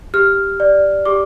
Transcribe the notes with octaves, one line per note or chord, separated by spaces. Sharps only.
G4 F6
D5
G4 D6